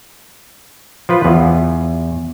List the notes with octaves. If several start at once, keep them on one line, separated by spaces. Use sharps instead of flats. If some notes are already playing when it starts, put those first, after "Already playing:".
F3 F4 B4
E2